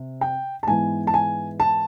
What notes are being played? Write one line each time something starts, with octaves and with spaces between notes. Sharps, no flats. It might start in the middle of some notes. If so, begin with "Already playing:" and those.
Already playing: C3
G5
A5
G#2 E3 G#3 B3 G#5
A5
G#5
A5